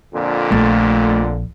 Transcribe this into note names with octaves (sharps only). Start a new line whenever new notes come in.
F2 A#2 D3
A#1 A3